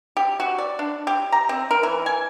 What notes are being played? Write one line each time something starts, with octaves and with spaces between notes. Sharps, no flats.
G4
F#4
D5
D4
G4
A#5
C4
A#4
E3
G#5